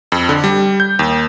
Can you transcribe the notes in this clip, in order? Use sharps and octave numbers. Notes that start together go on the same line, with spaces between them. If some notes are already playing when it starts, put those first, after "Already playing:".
F2
D3
G3
G6
D#2